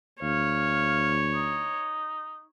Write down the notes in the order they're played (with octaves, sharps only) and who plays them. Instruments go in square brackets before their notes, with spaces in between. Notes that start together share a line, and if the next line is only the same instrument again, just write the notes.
[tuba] D2 [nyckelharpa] C#5 [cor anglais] F5
[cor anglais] D#4